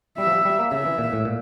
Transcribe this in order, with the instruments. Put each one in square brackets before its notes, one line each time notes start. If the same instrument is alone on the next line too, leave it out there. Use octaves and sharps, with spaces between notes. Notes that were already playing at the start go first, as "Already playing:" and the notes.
[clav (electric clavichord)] G3 [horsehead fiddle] E5
[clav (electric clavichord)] F3
G3
G3
A#3
[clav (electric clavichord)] C#3 [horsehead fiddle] E5
[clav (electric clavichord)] E3
A#2
A2
A#2